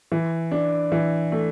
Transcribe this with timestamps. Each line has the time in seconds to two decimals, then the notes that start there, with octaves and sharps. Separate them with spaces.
0.12 E3
0.51 D4
0.92 E3
1.32 A3